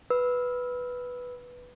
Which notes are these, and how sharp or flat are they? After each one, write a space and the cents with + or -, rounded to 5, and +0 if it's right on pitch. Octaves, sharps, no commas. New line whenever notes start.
B4 +0 E6 -15